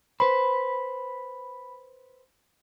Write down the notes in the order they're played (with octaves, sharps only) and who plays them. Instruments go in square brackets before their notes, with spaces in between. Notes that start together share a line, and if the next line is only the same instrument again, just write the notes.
[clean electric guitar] B4 C5 [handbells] B5